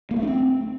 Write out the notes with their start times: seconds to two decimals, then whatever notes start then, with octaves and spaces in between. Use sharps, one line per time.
0.11 A#3
0.16 A3
0.22 D4
0.28 C4